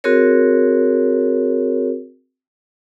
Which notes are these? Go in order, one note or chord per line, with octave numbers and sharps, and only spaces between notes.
C4 F#4 G#4 A#4 C#5